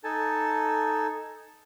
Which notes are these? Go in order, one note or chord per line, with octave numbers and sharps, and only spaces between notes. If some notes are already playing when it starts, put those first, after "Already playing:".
D#4 A4 G#5 A5